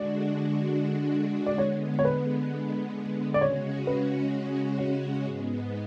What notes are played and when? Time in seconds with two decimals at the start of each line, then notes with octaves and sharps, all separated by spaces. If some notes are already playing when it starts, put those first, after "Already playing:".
Already playing: D3 G#3 D4 F#4 D5
1.46 D5
1.58 D3 G#3 B3 C#5
1.99 C#5
2.05 B4
3.34 D5
3.41 C#3 G#3 C#4 F#4 C#5
3.87 B4
4.79 C#5
5.24 G#2 G#3 B3